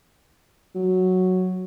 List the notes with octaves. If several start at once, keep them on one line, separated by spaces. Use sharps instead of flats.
F#3